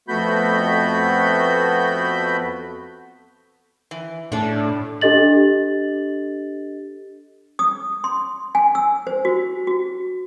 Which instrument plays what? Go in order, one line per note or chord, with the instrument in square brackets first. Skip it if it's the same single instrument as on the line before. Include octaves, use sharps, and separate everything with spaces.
[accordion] F2 A3 B3 F#4 B5 G6
[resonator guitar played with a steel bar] E3
[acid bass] A2 [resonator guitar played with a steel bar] D4 A4
[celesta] D4 G4 A4 D#5 A6 F#7
[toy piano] D#6
C6
G#5
E6
C5
F#4
F#4